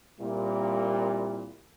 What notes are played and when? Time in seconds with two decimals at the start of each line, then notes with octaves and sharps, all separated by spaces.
0.19 A#2 G3 A#3 C4 E4